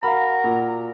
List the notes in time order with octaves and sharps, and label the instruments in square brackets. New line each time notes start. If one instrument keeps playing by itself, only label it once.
[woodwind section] F#4 A#4 A#5 [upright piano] F5 B5
[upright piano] A#2